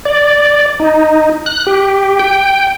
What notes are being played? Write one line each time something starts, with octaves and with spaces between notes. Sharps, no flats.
D5
D#4
F#6
G4
G5